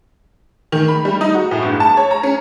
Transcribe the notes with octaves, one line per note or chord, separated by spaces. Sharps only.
D#3
B5
G3
D#4
F#4
A2
G1
A5
C#5
A#5
C#4